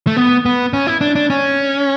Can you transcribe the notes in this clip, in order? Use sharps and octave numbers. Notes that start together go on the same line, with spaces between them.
A3
B3
B3
C#4
E4
D4
D4
C#4